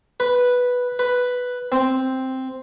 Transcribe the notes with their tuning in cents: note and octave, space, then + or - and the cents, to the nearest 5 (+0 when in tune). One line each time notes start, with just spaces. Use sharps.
B4 -5
B4 +0
C4 +0